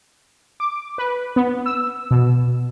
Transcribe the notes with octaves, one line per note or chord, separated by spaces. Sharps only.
D6
B4
B3
E6
B2